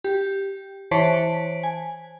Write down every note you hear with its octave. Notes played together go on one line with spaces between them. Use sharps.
G4
E3 C5 C#5 A5 B6 D7
G#5